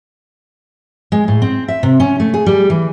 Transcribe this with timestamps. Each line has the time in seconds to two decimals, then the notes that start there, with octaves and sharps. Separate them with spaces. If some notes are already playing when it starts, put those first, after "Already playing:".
1.12 G#3
1.28 A2
1.42 C4
1.68 E5
1.83 C3
2.00 C#4
2.20 A3
2.34 G#4
2.46 G3
2.70 E3